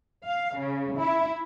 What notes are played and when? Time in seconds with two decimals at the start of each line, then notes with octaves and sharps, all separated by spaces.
0.25 F5
0.58 C#3
0.98 E4